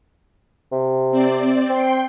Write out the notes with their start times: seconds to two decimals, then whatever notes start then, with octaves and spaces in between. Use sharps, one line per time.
0.72 C3
1.11 C4 D5
1.70 C4 G5 C6